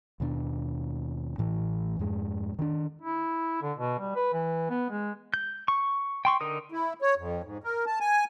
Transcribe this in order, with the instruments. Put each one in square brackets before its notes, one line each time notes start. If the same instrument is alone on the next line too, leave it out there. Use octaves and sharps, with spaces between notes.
[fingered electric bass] D#2 B2 G3 D4
A1 A2 E3
F2 G#2 G#3
D#3 C#4 D4
[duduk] E4
D3
B2
G3
B4
E3
B3
G#3
[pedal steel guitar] G6
C#6
G5 C6 C#6
D3 D#4 A#4 D#6
[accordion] E4
C#5
F2
G#2
A#4
A5
G#5